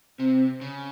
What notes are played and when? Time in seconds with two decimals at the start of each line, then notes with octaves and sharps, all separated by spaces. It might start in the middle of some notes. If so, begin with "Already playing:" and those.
0.19 C3 C4
0.61 C#3